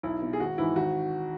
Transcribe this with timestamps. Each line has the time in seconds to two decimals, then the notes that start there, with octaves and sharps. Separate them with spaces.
0.03 B1 E4
0.22 B2
0.33 G#4
0.39 G#1 F#4
0.58 G#2 E3 E4
0.76 G#1 F#4